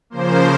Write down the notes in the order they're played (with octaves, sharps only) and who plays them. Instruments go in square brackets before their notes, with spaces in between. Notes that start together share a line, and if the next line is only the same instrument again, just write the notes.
[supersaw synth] C#3 F3 A#3 C5